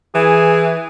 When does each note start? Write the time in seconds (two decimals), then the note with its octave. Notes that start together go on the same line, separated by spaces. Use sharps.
0.15 E3 G#4